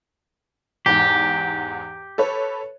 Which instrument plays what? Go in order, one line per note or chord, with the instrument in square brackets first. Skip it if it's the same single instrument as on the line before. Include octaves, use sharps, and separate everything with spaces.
[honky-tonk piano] E2 G#2 [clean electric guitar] G4
[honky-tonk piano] A4 B4 C#5